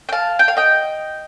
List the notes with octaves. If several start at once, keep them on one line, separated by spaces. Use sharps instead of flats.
G5
F5 A5
G5
F5
D#5 G5